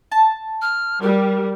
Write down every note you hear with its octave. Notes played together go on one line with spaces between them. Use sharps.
A5
F6
G3 A#4